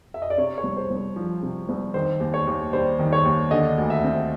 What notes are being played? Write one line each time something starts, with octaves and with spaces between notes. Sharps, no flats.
E5
D#5
D5
C3 C#5
C#5
C2
C5
C2
C5
F3
C3
C2
D#3 C5
D#2
C#5
D#2
G3 C5
D#3
C#5
D#2
D3 D#5
D2
E5
C4